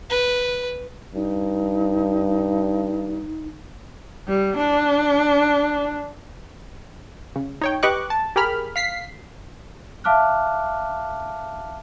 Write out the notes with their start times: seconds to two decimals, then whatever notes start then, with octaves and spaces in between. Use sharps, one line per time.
0.10 B4
1.15 G2 D#4
4.27 G3
4.57 D4
7.36 C#3
7.61 D#4 C#5 G5
7.83 G4 B4 D#5 C#6 D6 F#6
8.10 A5
8.36 G4 G#4 A#4 B5 F6
8.76 F5 B6 C7
10.04 E5 F5 A5 D6 F6 F#6